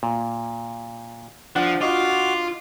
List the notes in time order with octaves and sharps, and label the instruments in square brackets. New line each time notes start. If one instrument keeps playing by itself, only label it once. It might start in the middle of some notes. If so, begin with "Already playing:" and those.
[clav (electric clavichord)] A#2
[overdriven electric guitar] F3 [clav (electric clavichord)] D4 [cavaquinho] F#5
[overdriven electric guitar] F4 [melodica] F#4 D6 [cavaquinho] D#5 C6